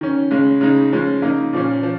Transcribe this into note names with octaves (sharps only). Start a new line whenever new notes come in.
D#3 C#4
C#3 G#3 C#4
C#3 G#3 D#4
F3 G#3 C#4
C#3 A#3 D#4
A#2 F3 C#4
F3